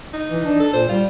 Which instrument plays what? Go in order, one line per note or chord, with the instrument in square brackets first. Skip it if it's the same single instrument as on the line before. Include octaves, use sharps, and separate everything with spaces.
[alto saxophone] D#4
[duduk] E3
D4
[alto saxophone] A4
[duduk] A#2 [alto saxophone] C5
[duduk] G3 [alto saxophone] F4